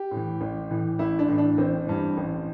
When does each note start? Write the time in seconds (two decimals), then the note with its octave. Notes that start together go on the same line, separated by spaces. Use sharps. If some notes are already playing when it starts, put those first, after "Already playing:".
Already playing: G4
0.11 A2 E3
0.41 A1
0.70 A2 E3
0.99 A1 E4
1.19 D4
1.28 A2 E3
1.38 D4
1.58 A1 C4
1.87 G2 E3
2.17 A1